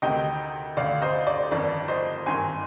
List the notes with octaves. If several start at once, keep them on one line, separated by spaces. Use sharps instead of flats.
D2 C3 D#3 D#5 G5
D2 D3 D5 F5
C5 D#5
D5
G1 F2 D#3 D5
C5 D#5
G#1 G2 D#3 G#5 C6